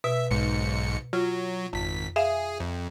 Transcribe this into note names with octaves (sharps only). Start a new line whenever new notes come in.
B2 E5
B1 G#2 C#7
F#3 F4
G#1 F2 B6
G#4 E5 F5
F2